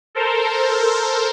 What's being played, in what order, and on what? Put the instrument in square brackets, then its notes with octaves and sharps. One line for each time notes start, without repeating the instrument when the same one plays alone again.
[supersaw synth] A4 A#4 C5